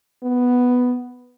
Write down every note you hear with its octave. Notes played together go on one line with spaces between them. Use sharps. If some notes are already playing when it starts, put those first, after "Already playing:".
B3